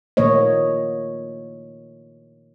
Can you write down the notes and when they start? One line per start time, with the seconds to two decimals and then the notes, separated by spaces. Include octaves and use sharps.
0.17 A#2 D#3 A3 A#3 C#5 D#5